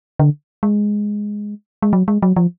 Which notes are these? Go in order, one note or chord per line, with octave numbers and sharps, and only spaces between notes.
D3
G#3
G#3
F#3
G#3
F#3
F3